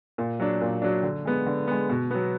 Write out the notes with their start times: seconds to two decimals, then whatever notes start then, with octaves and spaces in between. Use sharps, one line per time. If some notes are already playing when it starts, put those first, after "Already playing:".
0.18 A#2
0.40 F#3 D4
0.61 A#2
0.82 F#3 D4
1.03 D3
1.25 G#3 B3
1.46 D3
1.67 G#3 B3
1.89 B2
2.11 F#3 B3